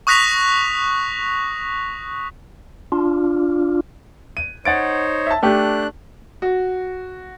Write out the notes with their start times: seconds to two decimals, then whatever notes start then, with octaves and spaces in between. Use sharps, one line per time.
0.07 C#6 D#6 F#6 A#6 B6 F7
2.92 D4 F4
4.37 D#7
4.65 D#4 C5 C#5 F#5 A6 D7
5.26 E5 A5
5.43 A3 D4 G4 F#6
6.42 F#4